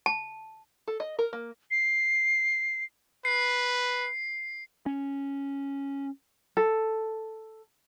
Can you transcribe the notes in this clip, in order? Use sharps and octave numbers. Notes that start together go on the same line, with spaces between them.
A5
A4
D#5
A#4
A#3
C7
B4 C7
C#4
A4